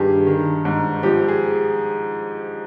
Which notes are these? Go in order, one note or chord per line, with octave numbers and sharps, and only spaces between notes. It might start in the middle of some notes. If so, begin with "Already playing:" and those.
Already playing: G2 D#3 G4 G#4
D#3
G#2
F3 G4
G#4